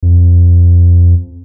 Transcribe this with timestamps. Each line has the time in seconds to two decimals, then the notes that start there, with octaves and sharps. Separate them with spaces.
0.03 F2